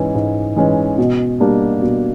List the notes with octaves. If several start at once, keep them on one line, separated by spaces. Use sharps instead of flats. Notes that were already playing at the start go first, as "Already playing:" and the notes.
Already playing: G#2 E3 G#3 C#4
G#2
E3 G#3 C#4
B2
G3 A#3 D4
B2